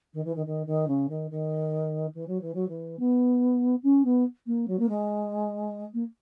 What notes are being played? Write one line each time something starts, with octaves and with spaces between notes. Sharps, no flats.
D#3
E3
D#3
D#3
D#3
C#3
D#3
D#3
E3
F#3
E3
F#3
E3
B3
C#4
B3
A#3
F#3
A#3
G#3
A#3